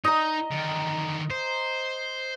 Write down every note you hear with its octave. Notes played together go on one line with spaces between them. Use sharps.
D#4 D#5 A#5
D3 D#3
C5